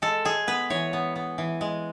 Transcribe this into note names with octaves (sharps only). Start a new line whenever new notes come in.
G#3 A4
G#3 G#4
B3 B4
E3 C#5
B3
B3
E3
G#3